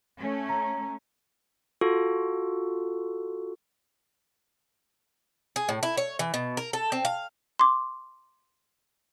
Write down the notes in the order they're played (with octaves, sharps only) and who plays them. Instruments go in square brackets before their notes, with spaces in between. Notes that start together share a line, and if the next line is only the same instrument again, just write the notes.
[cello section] A3 C#4
[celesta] A#5
[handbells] F4 F#4 A4
[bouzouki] G#4
A2
E4
C#5
E3
B2
A#4
A4
C4
F5
[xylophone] C6 D6